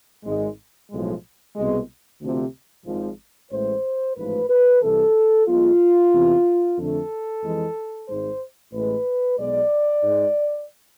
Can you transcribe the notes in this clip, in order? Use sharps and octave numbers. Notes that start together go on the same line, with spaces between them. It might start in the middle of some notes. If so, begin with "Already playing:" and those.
G#1 G#2 G#3
B1 A2 F3 G#3
C2 B2 G#3
D2 C3 F3
G#1 G#2 F3
A1 A2 E3 G#3 C5
A1 G#2 F3 A3 B4
B4
C2 C3 E3 A4
B1 B2 G#3 F4
E2 C3 E3
F2 D3 A3 A4
F2 E3 G#3
G#1 G#2 G#3 C5
A1 A2 G#3 B4
B1 B2 G#3 D5
G#2 G#3